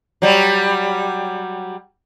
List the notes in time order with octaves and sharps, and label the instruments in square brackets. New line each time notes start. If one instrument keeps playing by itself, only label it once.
[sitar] F#3 G3